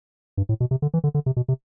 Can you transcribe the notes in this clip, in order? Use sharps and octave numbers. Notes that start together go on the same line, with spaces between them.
G2
A2
B2
C3
D3
E3
D3
D3
C3
B2
C3